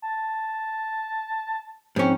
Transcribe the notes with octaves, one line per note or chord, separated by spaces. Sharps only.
A5
G#2 F3 C4 C#4